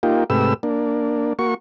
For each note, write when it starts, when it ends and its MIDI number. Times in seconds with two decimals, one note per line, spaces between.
0.03 0.24 58
0.03 0.24 63
0.03 0.24 65
0.03 0.24 67
0.30 0.54 44
0.30 0.54 48
0.30 0.54 57
0.30 0.54 67
0.30 0.54 71
0.30 0.54 88
0.63 1.33 58
0.63 1.33 62
1.39 1.54 58
1.39 1.54 66
1.39 1.54 85